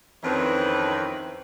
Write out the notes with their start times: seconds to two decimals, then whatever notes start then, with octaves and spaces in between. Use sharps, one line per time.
0.24 F2 D#3 E3 C4 C#4 B4